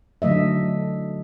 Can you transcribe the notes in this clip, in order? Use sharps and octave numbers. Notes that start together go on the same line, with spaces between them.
D3 F#3 A3 D#5 E5